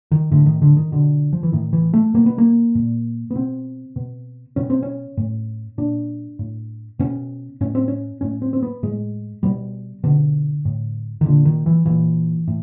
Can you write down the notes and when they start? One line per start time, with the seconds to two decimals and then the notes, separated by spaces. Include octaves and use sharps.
0.12 D#3
0.31 A2 D3
0.46 D#3
0.62 D3
0.77 D#3
0.92 B2 D3
1.33 F3
1.43 E3
1.52 A2 D#3
1.73 E3
1.94 A3
2.14 B2 A#3
2.26 B3
2.38 A#3
2.75 A#2
3.31 B3
3.35 B2 C4
3.96 B2
4.56 B2 C#4
4.70 C4
4.83 C#4
5.17 A2
5.78 A#2 D4
6.39 A2
6.99 B2 C#4
7.61 A2 C#4
7.75 C4
7.88 C#4
8.21 A2 C#4
8.42 C4
8.53 C4
8.63 B3
8.83 A2 G#3
9.43 B2 G3
10.04 B2 D3
10.65 A2
11.21 D#3
11.26 A#2 D3
11.45 D#3
11.66 E3
11.86 A#2 E3
12.48 A2